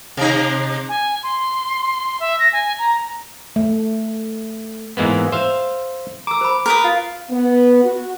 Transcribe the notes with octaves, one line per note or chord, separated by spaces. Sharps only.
C3 D#4
G#5
C6
E5
A#6
G#5
A#5
A3
G#2 E3 G#3 A#3 B3
C5 E5 F5
A#5 D6 E6
C5 B5
A#4 B4 D#6
F4
B3
F#4